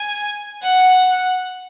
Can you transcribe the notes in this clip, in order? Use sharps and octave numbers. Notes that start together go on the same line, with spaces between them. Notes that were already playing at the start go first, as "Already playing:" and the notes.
Already playing: G#5
F#5